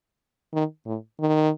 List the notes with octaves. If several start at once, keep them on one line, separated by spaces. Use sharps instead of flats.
D#3
A2
D#3